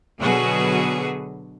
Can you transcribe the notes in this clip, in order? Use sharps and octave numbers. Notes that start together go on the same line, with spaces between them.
B2 D3 F#3 F#4 G#4 B4